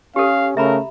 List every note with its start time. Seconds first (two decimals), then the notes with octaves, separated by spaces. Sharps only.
0.16 C#4 G4 A4 F5
0.57 C#3 A3 A#4 E5 A#5 B5